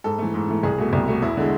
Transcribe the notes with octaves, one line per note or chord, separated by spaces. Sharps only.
G#2 A4
E3 A3
G#2
E3 A3
C2 G#4
B2 A3
C2
B2 A3
E2 E4
D3 G#3